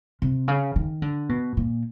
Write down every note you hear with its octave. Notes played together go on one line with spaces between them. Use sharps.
C3
C#3
D#3
D3
B2
A#2